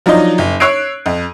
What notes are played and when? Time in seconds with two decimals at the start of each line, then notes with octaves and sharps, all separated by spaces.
0.06 F3 F#3 D4 D#4 D#5
0.38 F#1
0.60 C#5 E6 F#6 G#6 C7 D7
1.06 F2